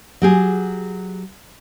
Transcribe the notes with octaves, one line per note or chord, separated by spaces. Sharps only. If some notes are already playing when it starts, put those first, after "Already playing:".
F#3 G4 G#4